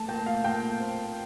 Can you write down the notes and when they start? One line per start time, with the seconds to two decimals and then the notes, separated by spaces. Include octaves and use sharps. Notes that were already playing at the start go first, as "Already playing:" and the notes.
Already playing: A3 A5
0.08 A#2 G5
0.26 F5
0.44 A#2 G5
0.79 C4